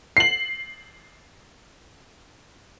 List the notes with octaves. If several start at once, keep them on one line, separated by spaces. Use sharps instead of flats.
C7 F#7